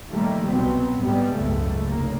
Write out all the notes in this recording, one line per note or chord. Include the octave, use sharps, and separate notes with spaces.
A#2 D#3 F3 G3 A3 A#3
C2 B2 F#3 B3 C4
G#2 G3 G#3 B3
F#1 C#2 G#2 C#3 A3
F1 A#3